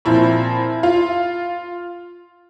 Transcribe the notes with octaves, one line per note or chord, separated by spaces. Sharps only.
A#2 F3 C4 E4
F4